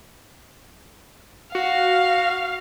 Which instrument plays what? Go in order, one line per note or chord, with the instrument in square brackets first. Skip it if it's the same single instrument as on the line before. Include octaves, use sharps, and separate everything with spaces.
[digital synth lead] F#4 [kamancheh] F5